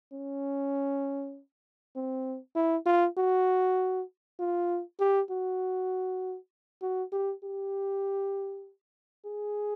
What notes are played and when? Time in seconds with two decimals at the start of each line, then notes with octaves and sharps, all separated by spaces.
0.13 C#4
1.96 C4
2.56 E4
2.86 F4
3.18 F#4
4.40 F4
5.00 G4
5.31 F#4
6.82 F#4
7.13 G4
7.44 G4
9.25 G#4